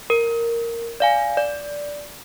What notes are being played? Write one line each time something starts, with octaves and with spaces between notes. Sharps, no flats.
A#4
D5 F5 G#5
D5